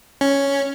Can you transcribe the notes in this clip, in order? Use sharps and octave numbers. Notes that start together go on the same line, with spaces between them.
C#4